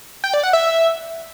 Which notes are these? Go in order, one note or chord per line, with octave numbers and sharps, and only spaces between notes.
G5
D5
F#5
E5